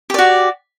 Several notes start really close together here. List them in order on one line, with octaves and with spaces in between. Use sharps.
G4 D5 F#4